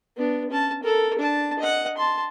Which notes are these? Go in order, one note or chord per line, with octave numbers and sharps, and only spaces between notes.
B3 D4
C#4 A5
A4 A#4
D4 A5
D#5 F#5
A5 C6